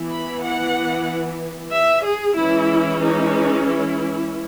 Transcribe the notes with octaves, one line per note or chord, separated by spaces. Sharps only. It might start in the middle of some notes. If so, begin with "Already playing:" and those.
Already playing: E3 B3
B5
F#5
E5
G#4
E3 G#3 C#4 E4
D#4
E4